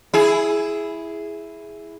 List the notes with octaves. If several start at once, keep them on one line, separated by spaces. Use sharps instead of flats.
E4 G#4